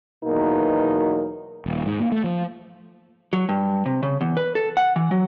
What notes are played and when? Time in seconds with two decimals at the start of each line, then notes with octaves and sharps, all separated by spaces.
0.25 E2 B2 F#3 A#3 D#4 A#4
1.66 D#1
1.86 G#2
2.00 A#3
2.12 A3
2.24 F3
3.33 F#3
3.49 G2
3.86 C3
4.03 C#3
4.21 E2
4.37 B4
4.55 A4
4.77 F#5
4.96 E3
5.11 F#3